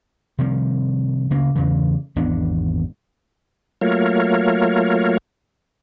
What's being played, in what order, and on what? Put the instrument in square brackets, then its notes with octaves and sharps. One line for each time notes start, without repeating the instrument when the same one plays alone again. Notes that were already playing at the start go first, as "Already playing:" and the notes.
[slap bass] C3 D#3 F3 G3
D2 C#3 A#3
E2 G2 C#3 E3
G#1 E2 B3 D4
[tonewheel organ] F#3 A3 A#3 F4 A#4 C#5